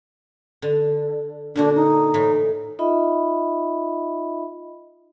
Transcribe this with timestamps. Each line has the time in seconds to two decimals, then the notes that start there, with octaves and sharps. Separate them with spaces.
0.62 D3
1.56 A#2 D3 D4 F#4
1.75 D#4
2.14 A2 E3
2.79 D#4 F4 D#5 E5 B5